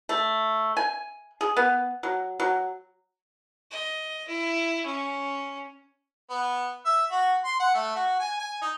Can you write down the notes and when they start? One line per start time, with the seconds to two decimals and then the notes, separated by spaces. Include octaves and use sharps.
0.09 A3
0.77 G#5
1.41 G#4
1.57 B3
2.03 F#3
2.40 F#3
3.71 D#5
4.28 E4
4.86 C#4
6.30 B3
6.86 E5
7.11 F#4
7.44 C6
7.60 F#5
7.75 A3
7.95 F#4
8.20 G#5
8.39 G#5
8.61 D#4